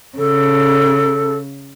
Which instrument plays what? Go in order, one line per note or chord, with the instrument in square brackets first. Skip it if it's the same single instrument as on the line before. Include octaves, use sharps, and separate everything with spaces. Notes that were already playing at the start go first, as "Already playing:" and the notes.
[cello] C#3 [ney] A4